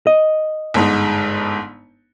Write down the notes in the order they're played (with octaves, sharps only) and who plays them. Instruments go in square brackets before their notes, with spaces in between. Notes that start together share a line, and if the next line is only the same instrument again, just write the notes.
[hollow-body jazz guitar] D#5
[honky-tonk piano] G1 G#2 D#4